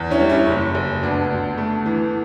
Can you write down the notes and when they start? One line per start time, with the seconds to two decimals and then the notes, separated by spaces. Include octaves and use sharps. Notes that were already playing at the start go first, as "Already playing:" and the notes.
Already playing: E2
0.11 C#4 E4
0.20 G3
0.29 C#4 E4
0.47 F#1
0.75 F#1
1.02 D2 B3 D4
1.30 D2
1.57 A3
1.86 E3